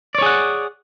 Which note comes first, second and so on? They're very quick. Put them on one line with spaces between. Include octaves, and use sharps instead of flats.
D5 C#5 G#4 F#5